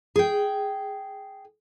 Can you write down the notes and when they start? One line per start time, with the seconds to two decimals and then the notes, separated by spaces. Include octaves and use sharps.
0.16 G#4 G5